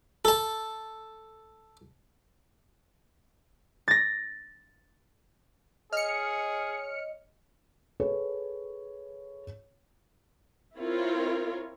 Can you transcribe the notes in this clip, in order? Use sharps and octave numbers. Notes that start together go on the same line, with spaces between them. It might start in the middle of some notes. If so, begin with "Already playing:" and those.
A4 A5
A6 A#6
G#4 C#5 D#5 F6 C#7
G#4 A4 B4 C#5
C4 E4 F4 A#4 C#5